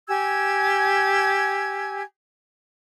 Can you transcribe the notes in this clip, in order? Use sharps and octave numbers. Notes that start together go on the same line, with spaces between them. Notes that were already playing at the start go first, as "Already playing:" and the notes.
G4 G#5 E6 G#6